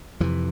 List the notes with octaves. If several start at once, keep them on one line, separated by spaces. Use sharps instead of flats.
F2 C3 E3